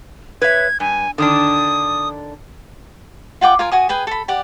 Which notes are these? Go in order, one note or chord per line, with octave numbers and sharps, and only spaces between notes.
B4 C#5 E5 G#6
G2 G#5
D3 D#3 D4 D#6
F4 F#5 G5 D6
F4 A#4 G#5
F#4 G#5 D#6
G#4 B4 G5 G#5
A4 B5
G4 D5 F#5